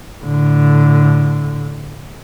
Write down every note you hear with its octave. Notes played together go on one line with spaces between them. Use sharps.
A2 D3